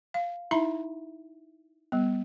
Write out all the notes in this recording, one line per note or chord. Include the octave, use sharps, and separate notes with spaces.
F5
D#4 E4 E5 A#5 B5
G3 B3